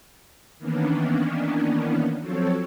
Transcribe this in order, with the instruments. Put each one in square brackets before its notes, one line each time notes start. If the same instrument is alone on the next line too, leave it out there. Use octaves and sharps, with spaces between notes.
[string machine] D#3 E3 A#3 B3 C#4 D4
F3 F#3 C4 A4 C#5